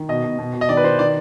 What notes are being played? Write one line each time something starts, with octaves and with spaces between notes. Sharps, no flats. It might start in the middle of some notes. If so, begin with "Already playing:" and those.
Already playing: D#3
B2 D#5
B2
B2
B2
D#5
D#3 D5
B4
D#3 C5
D#3 D5